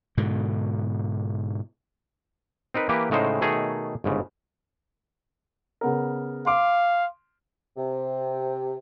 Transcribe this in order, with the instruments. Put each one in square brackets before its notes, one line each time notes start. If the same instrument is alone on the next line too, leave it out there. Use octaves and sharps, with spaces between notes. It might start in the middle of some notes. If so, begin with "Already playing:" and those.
[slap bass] G#2 B2 D3
[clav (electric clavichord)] C4 D#4 A#4 B4
E3 A#3 G4 A#4 B4
A2 C#3 G#3 D#4 C5
B2 D#3 A3 G#4 C#5 A#5
G1 G#2 C#3
[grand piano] C#3 B3 A#4
[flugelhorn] F5 [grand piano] C6 D6
[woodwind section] C3